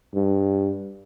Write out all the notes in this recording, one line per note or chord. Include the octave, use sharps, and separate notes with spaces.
G2